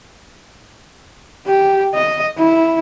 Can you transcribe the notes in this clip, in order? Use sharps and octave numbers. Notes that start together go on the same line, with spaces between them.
G4
D#5
E4